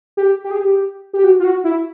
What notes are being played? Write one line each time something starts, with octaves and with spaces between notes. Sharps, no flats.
G4
G4
G#4
G4
G4
F#4
F4
F#4
E4